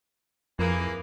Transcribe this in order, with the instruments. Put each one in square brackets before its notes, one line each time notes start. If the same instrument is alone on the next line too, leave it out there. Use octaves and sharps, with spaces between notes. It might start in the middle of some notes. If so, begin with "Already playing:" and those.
[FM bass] F2 [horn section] E3 A#3 G#4